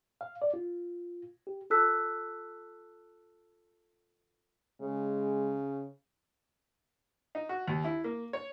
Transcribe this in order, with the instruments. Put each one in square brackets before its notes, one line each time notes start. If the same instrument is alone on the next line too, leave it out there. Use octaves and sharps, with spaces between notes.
[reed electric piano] F5
D5
F4
G4
[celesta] F4 A4 A5 E6 F#6 B6
[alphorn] C#3 [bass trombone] G#3
[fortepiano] D#4
F#4
D#2
E4
A#3
C#5